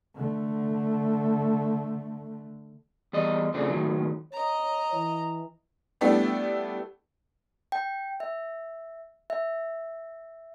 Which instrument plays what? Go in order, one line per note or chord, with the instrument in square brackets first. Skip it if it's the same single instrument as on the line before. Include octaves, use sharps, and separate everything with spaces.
[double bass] D3 A3
[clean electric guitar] E2 G3 D#5
F2 C#3 F3 A3 C4 D4
A2 D#3 F#3
[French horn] C#5 [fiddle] D#5 A#5
[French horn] E3
[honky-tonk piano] G3 A3 B3 D4 E4 G4
[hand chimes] G5
E5
E5